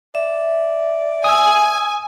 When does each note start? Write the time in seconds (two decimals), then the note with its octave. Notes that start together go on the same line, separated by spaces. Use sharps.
0.15 D5 E5
1.24 G#5 D#6 E6